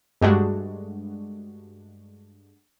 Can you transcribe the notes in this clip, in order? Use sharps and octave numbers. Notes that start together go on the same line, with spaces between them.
G2 G#3 A3 D4 F#4